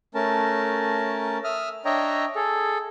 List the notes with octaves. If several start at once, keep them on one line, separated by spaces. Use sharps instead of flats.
A3 C#4 A#4 A5
E5 D#6 F6
D4 C#5 D#5 E5 G5 A#5
G#4 A4